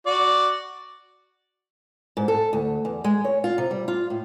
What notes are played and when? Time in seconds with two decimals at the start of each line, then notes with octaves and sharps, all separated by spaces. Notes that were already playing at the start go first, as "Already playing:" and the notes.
0.06 F#4 D5
2.17 G#2
2.28 A4
2.53 D2
2.85 E2
3.04 G#3
3.24 C#5
3.44 F4
3.58 C3
3.71 G3
3.88 F4
4.10 A2